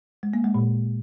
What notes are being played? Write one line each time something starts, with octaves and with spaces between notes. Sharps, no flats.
G#3
A#3
G#3
A#2